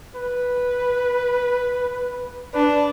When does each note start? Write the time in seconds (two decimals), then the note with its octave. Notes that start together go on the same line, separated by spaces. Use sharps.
0.15 B4
2.54 D4 B4